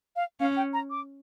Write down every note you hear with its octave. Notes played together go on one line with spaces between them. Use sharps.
F5
C#4 F5
G5
A#5
D6